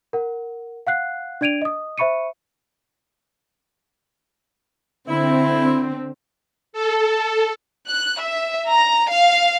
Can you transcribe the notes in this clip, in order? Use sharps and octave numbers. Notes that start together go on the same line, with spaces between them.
A#4 F#5
F5 F#5 F#6 C7
D4 D5 G#6 D7 D#7 F7
D#5 D#6
C5 E5 B5 C#6 C#7 D#7
D3 C4 E4
A4
F#6
E5
A#5
F5